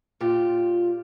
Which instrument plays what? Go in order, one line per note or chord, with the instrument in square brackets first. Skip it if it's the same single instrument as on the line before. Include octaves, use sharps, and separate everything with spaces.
[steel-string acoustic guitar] A#2 F4 G4